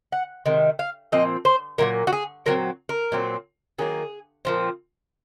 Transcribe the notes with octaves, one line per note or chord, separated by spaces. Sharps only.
F#5
C3 D#3 G#3
F5
A#2 F3 C4 D#5
C5
A#2 F#3 A#3 A#4
F#4
G#4
A#2 F#3 C4 A#4
A#4
A#2 F#3 C4
D#3 F#3 A#3 G#4
A#2 F3 C4